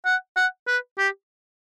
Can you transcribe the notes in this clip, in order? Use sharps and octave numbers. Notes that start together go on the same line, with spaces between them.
F#5
F#5
B4
G4